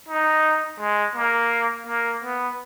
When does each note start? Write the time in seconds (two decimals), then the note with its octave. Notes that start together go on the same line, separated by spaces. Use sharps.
0.09 D#4
0.80 G#3
1.16 A#3
1.87 A#3
2.24 B3